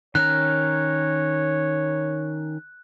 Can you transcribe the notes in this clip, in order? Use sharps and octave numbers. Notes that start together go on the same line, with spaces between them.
D#3 C#4 A#4 C#5 F#6